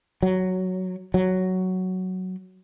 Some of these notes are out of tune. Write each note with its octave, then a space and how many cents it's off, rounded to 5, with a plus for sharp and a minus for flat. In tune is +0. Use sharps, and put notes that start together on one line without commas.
F#3 +5
F#3 +5